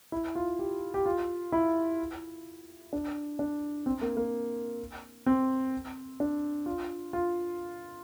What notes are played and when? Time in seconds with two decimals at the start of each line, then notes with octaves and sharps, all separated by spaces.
0.12 E4
0.35 F4
0.59 G4
0.94 G4
1.06 F4
1.52 E4
2.93 D4
3.39 D4
3.86 C4
4.01 A#3
4.17 A#3
5.26 C4
6.20 D4
6.66 F4
7.13 F4